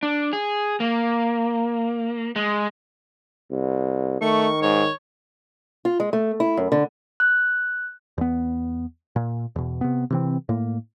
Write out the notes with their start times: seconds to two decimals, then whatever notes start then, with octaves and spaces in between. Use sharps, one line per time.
0.03 D4
0.33 G#4
0.80 A#3
2.36 G#3
3.51 C2
4.21 D#3 A3 C#6
4.62 G#2 C#5
5.85 F4
6.00 G#3
6.13 A3
6.40 E4
6.57 F#2
6.72 D3
7.20 F#6
8.18 E2 B3
9.16 A#2
9.56 E2 B2
9.81 C3 B3
10.10 C3 E3 C4
10.49 A2 A#3